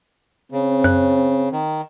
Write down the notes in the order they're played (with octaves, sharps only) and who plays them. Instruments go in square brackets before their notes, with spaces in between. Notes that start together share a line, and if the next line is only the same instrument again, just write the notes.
[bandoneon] C#3 [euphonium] C4
[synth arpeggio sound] F#2 C#5 F#6
[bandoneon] D#3